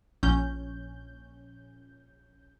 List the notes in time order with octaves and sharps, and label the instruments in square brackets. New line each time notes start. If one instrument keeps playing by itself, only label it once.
[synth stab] A#1 C#4 G6